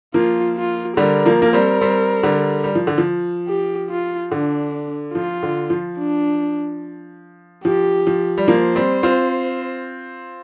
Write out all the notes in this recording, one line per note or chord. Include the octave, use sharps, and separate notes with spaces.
F3 A#3 F4
F4
D3 G3 A#4
F3 A#3
A#3
G3 C4
G3 C4
D3 G3
G3
F3
D3
F3
G4
F4
D3 D4
F3 F4
D3
F3
D4
F3 G4
F3
G3
F3 A#3 C5
G3 C4
C4 F4